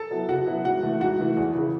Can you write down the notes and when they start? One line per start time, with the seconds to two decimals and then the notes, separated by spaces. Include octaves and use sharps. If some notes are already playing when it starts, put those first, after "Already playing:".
Already playing: A4 A5
0.11 F#3 B3 E4
0.29 C#3 F#4 F#5
0.46 F#3 B3 E4
0.65 G#2 F#4 F#5
0.83 E3 A3
1.00 G#2 F#4 F#5
1.19 E3 A3
1.37 E2
1.55 C#3 E3